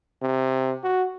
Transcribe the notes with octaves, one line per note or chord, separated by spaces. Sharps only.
C3
F#4